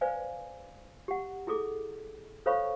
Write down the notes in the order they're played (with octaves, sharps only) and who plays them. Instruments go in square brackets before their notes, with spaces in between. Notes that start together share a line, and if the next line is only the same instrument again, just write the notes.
[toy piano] B4 C5 D5 F5 G#5
G4 F#5
E4 G#4 A4 D6
A4 C5 C#5 F5 B5 C#6